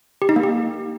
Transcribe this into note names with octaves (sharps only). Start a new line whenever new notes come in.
G4
D#4
A#3
G4